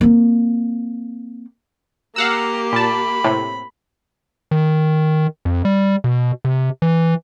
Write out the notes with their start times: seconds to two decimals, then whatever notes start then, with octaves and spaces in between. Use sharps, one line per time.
0.01 A#3 C4
2.16 A#3 G4 F5 F#5 A#5 E6
2.72 A#2 A5 B5
3.24 A2 C3
4.51 D#3
5.45 F2
5.65 G3
6.04 B2
6.45 C3
6.82 E3